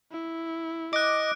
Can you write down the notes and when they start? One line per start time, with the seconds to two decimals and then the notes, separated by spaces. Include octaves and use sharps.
0.12 E4
0.93 D#5 D6 F#6 D7